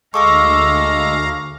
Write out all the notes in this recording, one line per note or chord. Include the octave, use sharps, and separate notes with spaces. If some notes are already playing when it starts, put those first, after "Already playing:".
D2 G#3 A4 F5 A#5 C#6 D6 E6